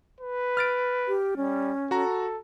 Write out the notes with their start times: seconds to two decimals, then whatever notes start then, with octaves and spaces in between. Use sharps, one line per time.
0.21 B4
0.57 F6 A6 D7
1.08 G4
1.37 G3 C#4
1.91 F#4 A4 A#5